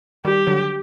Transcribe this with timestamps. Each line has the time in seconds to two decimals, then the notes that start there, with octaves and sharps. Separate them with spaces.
0.25 D#3 G3 G4
0.47 D3 F#3